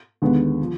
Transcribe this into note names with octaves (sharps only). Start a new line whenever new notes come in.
D#2 D3 G#3 B3
F3